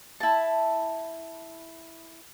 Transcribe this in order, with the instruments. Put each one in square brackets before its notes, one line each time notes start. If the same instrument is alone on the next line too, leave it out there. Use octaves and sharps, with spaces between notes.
[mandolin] E4 A5